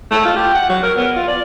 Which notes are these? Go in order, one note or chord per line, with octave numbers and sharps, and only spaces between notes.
A3
F4
G4
F#5
F#3
A#4
B3
F4
D5